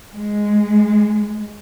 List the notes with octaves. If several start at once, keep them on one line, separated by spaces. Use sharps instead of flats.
G#3